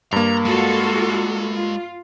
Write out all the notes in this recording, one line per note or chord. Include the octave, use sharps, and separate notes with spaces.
G2 A#3 A#5
G#3 F4 F#4 A4
F4